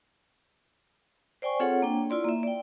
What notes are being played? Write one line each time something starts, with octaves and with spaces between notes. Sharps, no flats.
C5 D5 G5 G#5 C#6
C4 F4 G#4 A4 C#5 F#5
A#3 D4 G5
E4 F4 D5 C6
A#3 E5
D5 G5